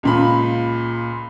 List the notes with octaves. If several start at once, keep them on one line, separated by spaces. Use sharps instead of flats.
C#2 A#2 B5